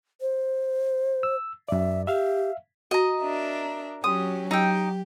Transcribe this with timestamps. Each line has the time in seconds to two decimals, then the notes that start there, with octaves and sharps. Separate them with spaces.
0.21 C5
1.23 E6
1.69 F#2 D5 E5
2.07 G4 E5 F5
2.91 F#4 D#5 A#5
3.21 D4 A#4 E5
4.04 F#3 C#4 G4 C6 D#6
4.51 F#3 D#4 G4 G5 E6